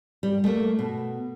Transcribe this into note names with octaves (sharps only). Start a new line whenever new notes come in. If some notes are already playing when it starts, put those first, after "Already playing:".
G3
A3 A#3
B2